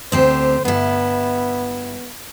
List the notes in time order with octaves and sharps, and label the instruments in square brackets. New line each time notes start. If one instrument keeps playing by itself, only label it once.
[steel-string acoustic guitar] D2 C4 G4 [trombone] C5
[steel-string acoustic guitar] G2 E4 [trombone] B3